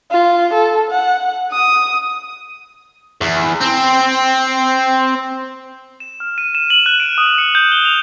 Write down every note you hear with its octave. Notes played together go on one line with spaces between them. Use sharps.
F4
A4
F#5
D#6
E2
C4
E7
F6
D#7
E7
F#7
F#6
D7
D#6
C#7
G6
G7
F7